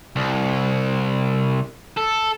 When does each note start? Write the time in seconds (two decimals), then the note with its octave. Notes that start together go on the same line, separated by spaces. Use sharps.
0.16 C2
1.97 A4